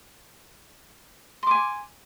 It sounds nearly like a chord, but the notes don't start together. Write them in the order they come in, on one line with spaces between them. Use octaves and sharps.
C6 D6 G#5